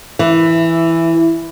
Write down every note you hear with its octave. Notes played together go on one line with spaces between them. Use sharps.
E3